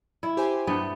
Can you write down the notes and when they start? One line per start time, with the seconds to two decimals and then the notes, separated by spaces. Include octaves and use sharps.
0.23 E4
0.37 G4 C5 G#5
0.67 G2 A3 B3